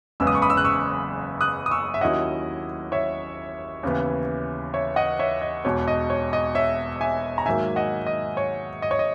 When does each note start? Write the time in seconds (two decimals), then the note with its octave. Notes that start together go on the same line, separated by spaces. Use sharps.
0.20 F#1 E2 C#3 G#3 B3 E6
0.27 D#6
0.35 C#6
0.42 B5 D#6
0.50 E6
0.57 F#6
0.64 C#6 E6
1.41 D#6 F#6
1.66 D#6
1.71 C#6 E6
1.94 E5
2.01 D#2 D#3 F#3 C#4 E4 D#5 F#5
2.92 C#5 E5
3.83 D#2 C#3 E3 B3
4.74 C#5 E5
4.96 D#5 F#5
5.19 C#5 E5
5.41 D#5
5.65 E1 E2 B2 C#5
5.88 D#5
6.10 C#5
6.33 D#5
6.55 C#5 E5
7.01 E5 G#5
7.38 A#5
7.46 G#2 D#3 F#3 A#3 E5 G#5
7.76 D#5 F#5
8.06 D#5
8.37 C#5
8.82 D#5
8.91 C#5
8.99 D#5